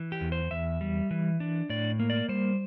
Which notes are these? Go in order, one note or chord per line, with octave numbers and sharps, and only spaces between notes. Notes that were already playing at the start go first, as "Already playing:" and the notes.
Already playing: E3
G4
E2
C5
E2 E5
G3
E3
D4
A2 D5
A#3
D5
G3 C5